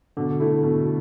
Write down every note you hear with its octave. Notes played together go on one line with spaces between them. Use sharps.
B2 D3
A3 E4
B2